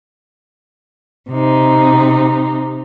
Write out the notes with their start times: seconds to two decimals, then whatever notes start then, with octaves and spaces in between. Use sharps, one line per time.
1.30 C3 D#4